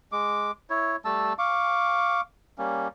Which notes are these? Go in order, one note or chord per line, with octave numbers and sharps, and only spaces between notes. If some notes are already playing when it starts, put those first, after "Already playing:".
G#3 D6
E4 C#5
G3 A3 A5 E6
F5 C#6 D6
G3 A#3 C#4